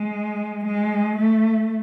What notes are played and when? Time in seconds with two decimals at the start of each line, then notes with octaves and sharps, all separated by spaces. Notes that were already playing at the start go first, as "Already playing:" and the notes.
Already playing: G#3
0.64 G#3
1.17 A3